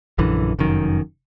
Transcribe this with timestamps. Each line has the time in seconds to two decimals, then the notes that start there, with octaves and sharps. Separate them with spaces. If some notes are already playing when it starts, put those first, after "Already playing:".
0.18 A#1 F#2 D3 E3
0.59 F1 F#2 D#3